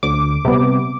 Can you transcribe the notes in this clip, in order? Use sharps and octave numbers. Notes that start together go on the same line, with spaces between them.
D2 D6
C3 G3 B3